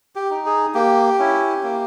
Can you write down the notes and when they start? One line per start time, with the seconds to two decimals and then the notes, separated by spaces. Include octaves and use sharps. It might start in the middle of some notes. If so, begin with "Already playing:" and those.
0.16 G4
0.31 D#4
0.46 G#4
0.74 A#3 G4
1.19 C#4 E4
1.63 A#3